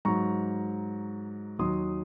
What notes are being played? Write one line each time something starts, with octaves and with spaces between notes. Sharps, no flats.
G#2 F#3 A#5 C#6
D#2 D#3 F#3 C6 D#6